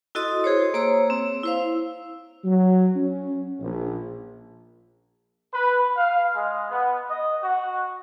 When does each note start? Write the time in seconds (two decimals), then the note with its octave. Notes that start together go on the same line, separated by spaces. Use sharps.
0.15 E4 F#4 A4 D#5 C6 D#6
0.44 G#4 C5 C#5
0.74 A#3 C5 C#5 A#5 E6
1.10 C4
1.44 E4 C5 F5
2.44 F#3
2.96 C#4
3.60 A#1
5.54 B4
5.97 F5
6.33 G#3
6.70 B3
7.10 D#5
7.42 F#4